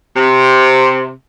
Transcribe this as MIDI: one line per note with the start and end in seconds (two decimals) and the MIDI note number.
0.17 1.10 48